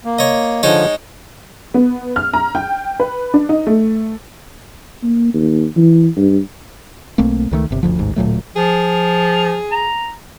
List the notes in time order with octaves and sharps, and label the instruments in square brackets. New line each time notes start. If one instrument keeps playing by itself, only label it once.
[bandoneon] A#3
[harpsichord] C#5 D#5
[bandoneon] D3 F3 [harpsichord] G#3 D#4 C#5
[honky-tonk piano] B3
F6
A#5
G5
B4
D4
D#4
A3
[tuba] A#3
D#2
E3
G2
[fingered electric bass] B1 A3 A#3 C4
C#2 D#3 A3
G1 C3
F#1 D2 F3
A1 D#2 G#2
D1 A#2 F#3 A3
[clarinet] F3 [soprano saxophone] G#4
[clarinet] A#5